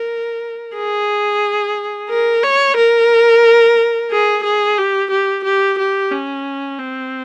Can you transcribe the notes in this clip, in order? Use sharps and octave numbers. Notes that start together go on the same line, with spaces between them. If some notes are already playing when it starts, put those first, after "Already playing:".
Already playing: A#4
G#4
A#4
C#5
A#4
G#4
G#4
G4
G4
G4
G4
C#4
C4